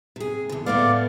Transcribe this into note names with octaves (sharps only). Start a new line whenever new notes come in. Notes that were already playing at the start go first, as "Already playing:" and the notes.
C3 G#4
E2 D3
A2 A3 B3 D5 F5 D6